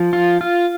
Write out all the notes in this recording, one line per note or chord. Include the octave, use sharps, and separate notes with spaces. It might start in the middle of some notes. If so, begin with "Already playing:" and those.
Already playing: F3
F4
F4